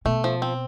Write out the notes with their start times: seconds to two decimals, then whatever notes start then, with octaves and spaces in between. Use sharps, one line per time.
0.05 B2 A3
0.24 F3
0.42 C4